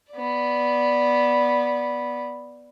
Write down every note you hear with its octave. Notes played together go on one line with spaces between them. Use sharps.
B3 D5